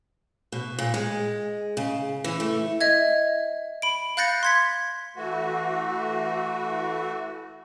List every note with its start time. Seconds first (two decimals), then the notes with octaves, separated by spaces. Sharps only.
0.52 B2
0.79 A#2
0.94 G#3
1.77 C#3
2.24 E3
2.40 A3
2.81 D#5 E5 G#6
3.82 B5 D7
4.17 F5 F#6 G6 A6 A#6 C#7
4.43 C6 G#6 B6
5.16 E3 A3 F#4